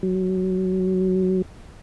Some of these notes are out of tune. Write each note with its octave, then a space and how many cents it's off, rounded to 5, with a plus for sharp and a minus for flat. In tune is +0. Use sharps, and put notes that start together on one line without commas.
F#3 +10